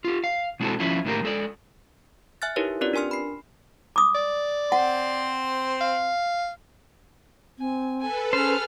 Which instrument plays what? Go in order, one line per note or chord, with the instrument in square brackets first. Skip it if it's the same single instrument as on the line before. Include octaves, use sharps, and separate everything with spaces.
[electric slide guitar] F4 G4
F5
B2 G#3 C4 E4 F#4 A4
F3 C#4 E4 F4
A2 D#3 A#3 B3 G4 A#4
G#3 A4 D5
[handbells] E5 G#5 F6 F#6 A6
D#4 E4 G4 A#4 B4 C#5
C4 C#4 F4 G4 B4 D5
D4 A#4 G#5 C6 F6
B5 C7
[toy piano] D6 D#6
[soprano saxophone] D5
[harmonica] C4 C5 C6 [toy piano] F#5
[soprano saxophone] F5
[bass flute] C4 [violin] G#5
[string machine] A4 B4 [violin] G#5
[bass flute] C#4 [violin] G#4 F6 [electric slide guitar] C5